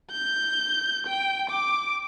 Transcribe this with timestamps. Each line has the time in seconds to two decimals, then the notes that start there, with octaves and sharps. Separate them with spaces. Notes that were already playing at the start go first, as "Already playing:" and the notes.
0.12 G6
1.07 G5
1.50 D6